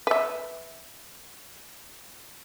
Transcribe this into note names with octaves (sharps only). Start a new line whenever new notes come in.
B4 E5